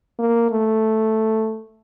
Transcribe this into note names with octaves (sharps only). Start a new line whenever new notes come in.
A#3
A3